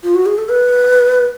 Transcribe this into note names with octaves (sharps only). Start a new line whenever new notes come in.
F4
F#4
G#4
A4
B4